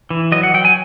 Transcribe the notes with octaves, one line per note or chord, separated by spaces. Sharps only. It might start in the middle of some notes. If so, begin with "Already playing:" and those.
E3
F#3 D#5
F#5
F#3 G5
G#5